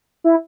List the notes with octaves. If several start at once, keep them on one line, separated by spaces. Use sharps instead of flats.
E4